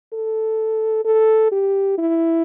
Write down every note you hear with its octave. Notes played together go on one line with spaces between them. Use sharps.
A4
A4
G4
E4